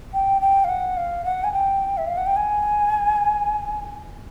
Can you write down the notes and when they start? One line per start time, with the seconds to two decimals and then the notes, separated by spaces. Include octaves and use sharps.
0.14 G5
0.41 G5
0.64 F5
0.69 F#5
0.97 F5
1.25 F#5
1.44 G#5
1.53 G5
1.97 E5
2.07 F5
2.17 F#5
2.26 G5
2.36 G#5